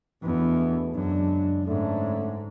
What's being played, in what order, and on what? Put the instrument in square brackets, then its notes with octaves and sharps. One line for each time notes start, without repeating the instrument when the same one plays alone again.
[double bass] E2 [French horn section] B2 A3 D4
[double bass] F#2 [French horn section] C#3 G#3 D4
[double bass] G#2 [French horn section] D3 A3 C#4